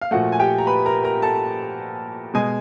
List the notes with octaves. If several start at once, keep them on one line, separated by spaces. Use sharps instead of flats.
F5
A#2 F3 A3 F#4 F#5
G#5
G4 G5
A#5
B4 B5
A#4 A#5
A#4 A#5
A4 A5
B2 G#3 G#4 G#5